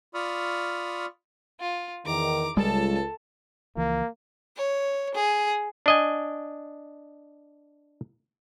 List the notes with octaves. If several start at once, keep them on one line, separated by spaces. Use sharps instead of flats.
F4 D5 B5 C#6 D#6 F6
F4
E2 D#3 A#5 D6
C#2 G3 G#3 A4 A5
C#2 E3 F3 A#3
C#5
G#4
D4 D#5 G#5